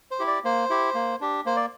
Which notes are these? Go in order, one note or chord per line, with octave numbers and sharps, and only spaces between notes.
C5
E4 G4
D5
A#3 C5
E4 G4
A#3
D4 G4
A#3 C5
D5